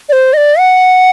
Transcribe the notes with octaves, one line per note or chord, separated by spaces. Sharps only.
D5
C5
D#5
D5
F#5